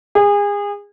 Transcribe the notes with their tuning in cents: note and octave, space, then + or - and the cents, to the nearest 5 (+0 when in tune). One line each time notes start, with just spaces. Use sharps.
G#4 -30